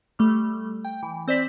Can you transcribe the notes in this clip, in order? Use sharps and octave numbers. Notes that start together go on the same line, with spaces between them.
G3 A3
G5
E3
C4 C5 D5 B6 E7